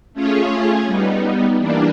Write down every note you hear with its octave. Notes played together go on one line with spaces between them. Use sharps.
A3 C#4 F4 G#4 C#5
G3 B3 D#4
E3 G3 A#3 D4